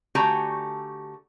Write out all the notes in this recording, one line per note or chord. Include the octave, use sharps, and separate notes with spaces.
D3 A3 F#4 G4 G#5 A#5